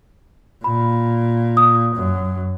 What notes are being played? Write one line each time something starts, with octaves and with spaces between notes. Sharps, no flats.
A#2 B5
D#6
F#2